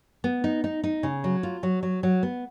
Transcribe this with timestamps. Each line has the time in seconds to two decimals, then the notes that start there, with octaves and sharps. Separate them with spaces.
0.24 B3
0.44 D#4
0.64 D#4
0.84 D#4
1.03 C#3
1.24 F#3
1.43 F4
1.63 F#3
1.83 F#3
2.03 F#3
2.23 B3